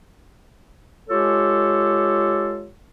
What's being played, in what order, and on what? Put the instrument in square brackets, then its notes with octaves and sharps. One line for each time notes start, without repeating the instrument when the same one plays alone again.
[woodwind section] G#3 F4 G4 A4 C#5